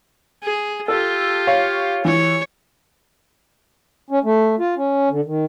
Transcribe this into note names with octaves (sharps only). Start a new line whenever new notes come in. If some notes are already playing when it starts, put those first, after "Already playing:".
G#4
F4 G4 A4
C#5 F5
E3 C#5
C#4
A3
F4
C#4
D3
D#3